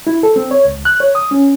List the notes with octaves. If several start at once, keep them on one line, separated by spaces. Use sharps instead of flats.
E4
A4
C4
C#5
C#2
F#6
C#5
D#6
C#4